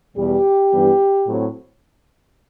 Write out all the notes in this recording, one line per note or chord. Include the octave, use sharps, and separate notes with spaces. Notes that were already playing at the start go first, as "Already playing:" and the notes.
E2 B2 G3 G4
G2 E3 G3 B3
A2 F#3 C4